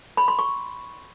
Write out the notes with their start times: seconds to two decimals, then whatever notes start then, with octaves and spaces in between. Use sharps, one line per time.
0.17 B5
0.28 C6
0.39 C#6